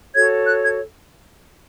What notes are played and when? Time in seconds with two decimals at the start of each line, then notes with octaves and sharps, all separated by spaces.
0.15 F#4 A4 C#5 G#6
0.47 F#6
0.64 G#6